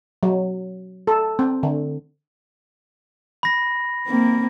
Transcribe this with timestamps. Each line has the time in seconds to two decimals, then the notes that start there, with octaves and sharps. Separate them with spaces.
0.23 F#3
1.07 A4
1.39 C4
1.63 D3
3.43 B5 A#6
4.07 A#3 C4